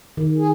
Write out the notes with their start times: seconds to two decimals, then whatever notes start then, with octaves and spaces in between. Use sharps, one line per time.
0.17 D#3
0.38 G#4